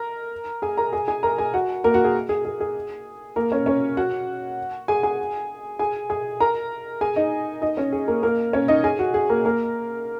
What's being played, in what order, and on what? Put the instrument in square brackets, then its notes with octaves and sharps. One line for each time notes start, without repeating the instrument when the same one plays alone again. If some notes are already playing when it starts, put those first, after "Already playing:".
Already playing: [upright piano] A#4 A#5
G#4 G#5
A#4 A#5
G#4 G#5
G#4 G#5
A#4 A#5
G#4 G#5
F#4 F#5
A#3 A#4
F#4
G#4
G#4
G#4
G#4
A#3 A#4
C#4 C#5
C#4 C#5
F#4 F#5
G#4 G#5
G#4 G#5
G#4 G#5
G#4 G#5
A#4 A#5
G#4 G#5
D#4 D#5
D#4 D#5
C#4 C#5
G#4
A#3 A#4
A#3 A#4
C#4 C#5
D#4 D#5
G#4 G#5
F#4
G#4
A#3 A#4
A#3 A#4